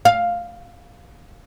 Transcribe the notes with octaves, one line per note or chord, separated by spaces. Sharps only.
F5